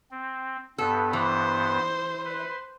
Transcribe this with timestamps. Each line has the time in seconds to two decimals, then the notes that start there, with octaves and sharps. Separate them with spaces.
0.11 C4
0.78 G2 B3 A4
1.13 E3 C5
2.25 B4